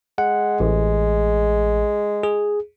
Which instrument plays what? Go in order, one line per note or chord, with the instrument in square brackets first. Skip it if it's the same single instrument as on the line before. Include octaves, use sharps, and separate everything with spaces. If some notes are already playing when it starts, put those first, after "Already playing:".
[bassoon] G#3 [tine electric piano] F#5
[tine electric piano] A1
G#4